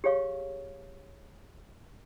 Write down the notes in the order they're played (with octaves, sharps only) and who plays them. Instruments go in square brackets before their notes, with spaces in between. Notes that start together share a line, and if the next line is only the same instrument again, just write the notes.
[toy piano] G4 G#4 C#5 F5 C#6